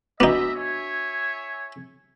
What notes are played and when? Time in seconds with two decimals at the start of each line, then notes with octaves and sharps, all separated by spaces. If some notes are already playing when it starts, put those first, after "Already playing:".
0.20 B3 D4 D#4 F#4 D#5 E5 D6
0.55 C#5 E5 G#5